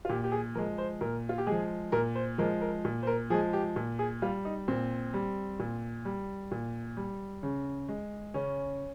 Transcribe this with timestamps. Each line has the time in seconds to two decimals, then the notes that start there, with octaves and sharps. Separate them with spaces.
0.05 F4
0.09 A#2 G4
0.24 G4
0.32 G#4
0.55 F3 A#4
0.58 G#3
0.78 C5
1.01 A#2 A#4
1.29 F4
1.38 G4
1.47 F3 G#3 G#4
1.92 A#2 A#4
2.15 C5
2.38 F3 G#3 A#4
2.61 A#4
2.85 A#2
3.03 C5
3.07 A#4
3.30 F3 G#4
3.34 G#3
3.53 G4
3.76 A#2
3.99 G#4
4.22 G3 F4
4.45 D#4
4.68 A#2 C4
5.14 G3
5.59 A#2
6.05 G3
6.51 A#2
6.97 G3
7.43 C#3
7.88 G#3
8.34 C#3 C#4